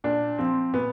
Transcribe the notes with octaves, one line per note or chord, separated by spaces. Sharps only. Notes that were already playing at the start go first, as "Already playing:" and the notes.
A#2 D4
F3 C4
A#2 B3